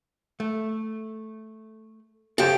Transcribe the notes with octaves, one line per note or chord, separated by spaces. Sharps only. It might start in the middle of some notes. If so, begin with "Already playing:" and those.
A3
C#3 G4 A4 C5 G5